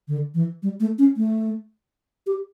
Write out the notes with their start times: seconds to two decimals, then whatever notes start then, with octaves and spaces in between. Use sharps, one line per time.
0.08 D3
0.34 E3
0.63 G3
0.80 A3
0.99 C#4
1.17 A3
2.27 G4